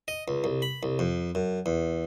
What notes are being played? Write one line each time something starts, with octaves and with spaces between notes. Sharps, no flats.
D#5
C#2
C2
B5
C2
F2
F#2
E2